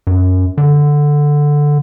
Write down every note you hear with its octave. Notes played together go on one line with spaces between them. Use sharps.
F#2
D3